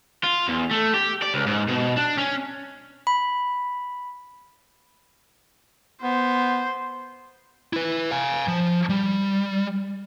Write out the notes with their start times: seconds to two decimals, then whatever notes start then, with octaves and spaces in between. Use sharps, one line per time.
0.24 F4
0.48 E2
0.71 A3
0.94 G4
1.22 D5
1.34 C#2
1.46 G#2
1.69 B2
1.97 D4
2.18 C#4
3.07 B5
6.02 B3 C5
7.73 E4 B4
8.11 F5 G#5
8.48 F3
8.89 G3